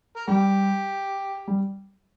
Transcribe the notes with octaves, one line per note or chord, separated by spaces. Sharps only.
A#4
G3 G4
G3